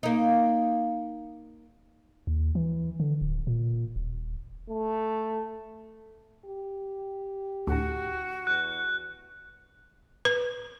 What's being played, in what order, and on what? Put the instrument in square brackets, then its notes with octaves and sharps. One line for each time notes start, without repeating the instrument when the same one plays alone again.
[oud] A#3 D#4
[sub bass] D#2
E3
D3
D1
A#2
D#1
[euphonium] A3
[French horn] G4
[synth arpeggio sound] D2 A2 [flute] F#4
[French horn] E2 [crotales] F#6
[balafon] B4